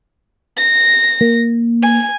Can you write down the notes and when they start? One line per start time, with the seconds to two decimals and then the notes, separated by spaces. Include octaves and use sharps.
0.57 A#6
1.21 A#3
1.82 G#5